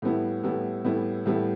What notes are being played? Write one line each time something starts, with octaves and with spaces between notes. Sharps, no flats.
A2 G3 B3 E4
A2 G3 B3 E4
A2 G3 B3 E4
A2 G3 B3 E4